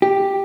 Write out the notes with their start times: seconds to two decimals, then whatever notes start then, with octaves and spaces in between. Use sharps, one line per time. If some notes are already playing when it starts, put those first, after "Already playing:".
0.02 G4